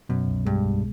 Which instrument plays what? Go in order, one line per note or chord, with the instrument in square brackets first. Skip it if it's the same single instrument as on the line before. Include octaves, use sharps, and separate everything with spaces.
[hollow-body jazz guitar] F#2 [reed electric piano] B2
[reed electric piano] C2
[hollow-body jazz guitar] G2 [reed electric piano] G#3
[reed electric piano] C2